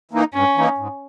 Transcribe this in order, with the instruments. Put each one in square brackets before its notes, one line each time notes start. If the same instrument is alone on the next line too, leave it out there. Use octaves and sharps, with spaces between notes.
[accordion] E3 A#3 D#4
[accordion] G2 [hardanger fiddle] C#4
[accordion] E3 A#3 D#4
G#2